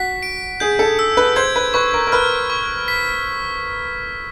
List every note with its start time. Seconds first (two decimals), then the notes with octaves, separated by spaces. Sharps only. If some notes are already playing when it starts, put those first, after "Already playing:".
Already playing: F#4 B6
0.23 D7
0.60 G#4 G6
0.79 A4
0.99 E6
1.17 B4
1.36 C5 G#6
1.56 B4
1.74 B4 C#6
1.94 A#4
2.07 A#4
2.12 B4 F6
2.50 C#6
2.88 B6